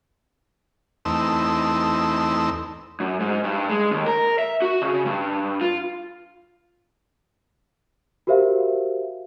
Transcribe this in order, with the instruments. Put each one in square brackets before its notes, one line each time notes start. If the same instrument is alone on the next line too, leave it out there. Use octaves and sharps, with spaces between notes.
[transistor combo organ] E2 A3 C4 D#4 E6
[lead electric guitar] F#2
G#2
G2
G#3
D#2
A#4
E5
F#4
C#3
G2
F4
[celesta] F#4 G4 A#4 C5 E5 F5